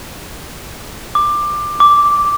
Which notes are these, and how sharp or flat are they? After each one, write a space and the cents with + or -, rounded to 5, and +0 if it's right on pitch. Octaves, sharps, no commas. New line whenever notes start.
D6 +15
D6 -5